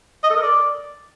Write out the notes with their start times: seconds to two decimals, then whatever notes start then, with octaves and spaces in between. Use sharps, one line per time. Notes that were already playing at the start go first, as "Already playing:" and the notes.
0.24 D#5
0.30 A4
0.37 A#4
0.43 D5